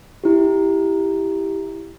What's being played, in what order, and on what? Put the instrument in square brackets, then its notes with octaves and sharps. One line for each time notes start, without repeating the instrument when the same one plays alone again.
[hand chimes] E4 G4